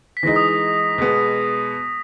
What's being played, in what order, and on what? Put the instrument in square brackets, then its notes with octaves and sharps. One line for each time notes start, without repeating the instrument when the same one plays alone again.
[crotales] B6
[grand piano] E3 G#3 D#4 [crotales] A#6
[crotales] D#6
D#6
[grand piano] B2 G#3 B3